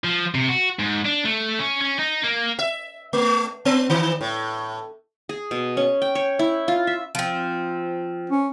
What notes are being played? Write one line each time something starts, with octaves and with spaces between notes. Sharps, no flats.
F3
C3
F#4
G#2
D4
A3
C#4
C#4
D#4
A#3
E5
A3
B3
D#3
A2
G#4
B2
C#4
G5
C#5
E4
F4
E5
F3 C4
C#4